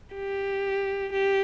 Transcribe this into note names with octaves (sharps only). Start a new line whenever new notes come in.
G4
G4